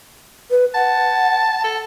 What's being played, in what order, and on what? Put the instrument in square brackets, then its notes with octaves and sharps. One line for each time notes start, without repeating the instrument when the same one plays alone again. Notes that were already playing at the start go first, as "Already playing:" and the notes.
[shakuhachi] B4
[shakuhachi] F#5 [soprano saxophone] A5
[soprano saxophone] A4